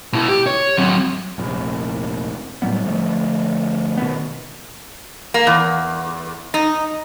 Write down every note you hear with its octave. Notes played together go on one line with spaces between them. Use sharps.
B2 E4
G4
C#5
F#3 C4
F1 A#1
A2 F#3 G3 B3
D2 F3 A3
B2 D#3 B3
A#3
E2
D#4